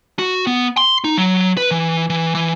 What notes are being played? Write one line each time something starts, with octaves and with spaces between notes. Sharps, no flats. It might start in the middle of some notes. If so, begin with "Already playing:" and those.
F#4
B3
C6
D#4
F#3
B4
E3
E3
E3